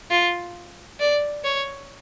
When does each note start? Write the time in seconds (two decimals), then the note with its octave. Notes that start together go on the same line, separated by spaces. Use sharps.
0.11 F4
1.00 D5
1.44 C#5